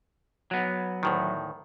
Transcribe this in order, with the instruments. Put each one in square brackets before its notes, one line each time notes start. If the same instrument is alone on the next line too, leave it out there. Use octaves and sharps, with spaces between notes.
[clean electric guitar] F#3 B3
[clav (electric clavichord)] D2 A2 D#3